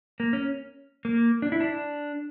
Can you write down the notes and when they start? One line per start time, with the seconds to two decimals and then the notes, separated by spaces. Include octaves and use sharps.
0.20 A#3
0.33 C#4
1.05 A#3
1.42 D4
1.52 E4
1.60 D4